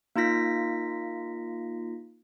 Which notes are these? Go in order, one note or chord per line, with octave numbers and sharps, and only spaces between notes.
A#3 D#4 F4 A#6 B6